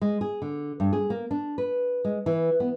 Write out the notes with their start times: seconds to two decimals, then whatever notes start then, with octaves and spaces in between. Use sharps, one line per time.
0.01 G#3
0.21 G#4
0.42 D3
0.80 G2
0.93 G#4
1.10 A#3
1.31 D4
1.58 B4
2.05 G#3
2.26 E3
2.60 B3